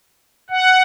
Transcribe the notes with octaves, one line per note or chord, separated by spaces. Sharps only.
F#5